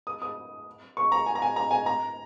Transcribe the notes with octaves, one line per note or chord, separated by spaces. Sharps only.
D#6
D#6
C#6
A#5
G#5
A#5
G#5
A#5
G#5
A#5